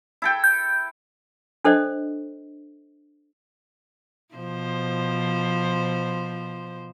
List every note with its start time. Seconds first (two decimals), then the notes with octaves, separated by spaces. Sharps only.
0.22 E4 A4 G5
0.44 G6
1.64 D4 A4 C5 D5 D#5
4.35 B2 F3 C5